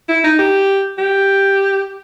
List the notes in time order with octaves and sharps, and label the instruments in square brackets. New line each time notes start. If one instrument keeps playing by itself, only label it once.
[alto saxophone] E4
D#4
G4
G4